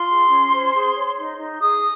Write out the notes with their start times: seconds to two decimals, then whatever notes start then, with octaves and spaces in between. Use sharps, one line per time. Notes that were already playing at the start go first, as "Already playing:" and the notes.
Already playing: F4 C6
0.09 G#4
0.30 C#4
0.52 C5
0.74 G#4
0.96 C#5
1.18 D#4
1.39 D#4
1.62 G#4 D#6